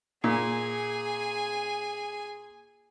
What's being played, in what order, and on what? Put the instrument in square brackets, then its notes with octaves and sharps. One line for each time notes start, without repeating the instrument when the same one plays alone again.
[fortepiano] A#2 [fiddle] G#4 G#5